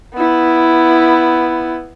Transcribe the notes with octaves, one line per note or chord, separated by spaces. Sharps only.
B3 E4